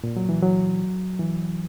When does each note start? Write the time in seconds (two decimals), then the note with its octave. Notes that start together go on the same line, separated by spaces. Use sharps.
0.04 A#2
0.17 F#3
0.29 E3
0.42 F#3
1.19 E3